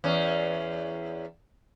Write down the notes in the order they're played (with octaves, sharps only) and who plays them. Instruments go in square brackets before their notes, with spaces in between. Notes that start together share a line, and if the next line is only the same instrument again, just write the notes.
[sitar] E2 C#4